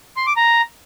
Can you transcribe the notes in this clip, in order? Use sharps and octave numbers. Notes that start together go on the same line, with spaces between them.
C6
D6
A#5